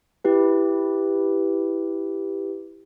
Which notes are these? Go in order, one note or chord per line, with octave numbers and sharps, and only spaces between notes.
E4 G4 B4